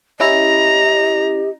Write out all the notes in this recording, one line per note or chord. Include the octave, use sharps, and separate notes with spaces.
C#4 E4 G4 D#5 A#5